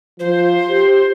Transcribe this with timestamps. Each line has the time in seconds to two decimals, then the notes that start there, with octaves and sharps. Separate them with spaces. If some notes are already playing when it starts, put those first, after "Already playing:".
0.20 F3 C5
0.69 G4